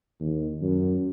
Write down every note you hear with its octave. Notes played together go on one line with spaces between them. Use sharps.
D#2
F#2